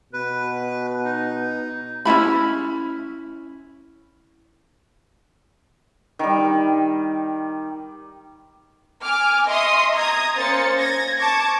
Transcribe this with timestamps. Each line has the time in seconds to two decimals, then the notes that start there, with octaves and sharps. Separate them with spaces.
0.13 B2 B4
1.05 D#4
2.05 C#4 D4 E4 B5
6.19 D#3 G3
9.03 G#5 D6 F6
9.47 D#5 E5 C6 C#6 D#6
9.95 A#5 D#6 G#6
10.37 A#3 C#4 C5 A6 C#7
10.79 G#6 A#6
11.19 A5 C#6 D6 G#6